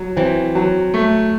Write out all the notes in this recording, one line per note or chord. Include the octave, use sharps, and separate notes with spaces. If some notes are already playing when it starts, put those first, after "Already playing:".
Already playing: F#3
E3 C4
F#3
A3